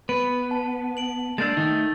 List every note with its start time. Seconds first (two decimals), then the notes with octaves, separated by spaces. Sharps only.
0.09 B3 B4 D7
0.51 A5
0.97 D7 F#7
1.38 G#3 A#3 D4 E6 G6 A6
1.57 D#3 A3 D#4